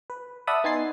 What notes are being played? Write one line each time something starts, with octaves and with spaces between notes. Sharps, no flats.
B4
D5 E5 F#5 A5 B5 D#6
B3 D#4 G#5 C6 A6 C7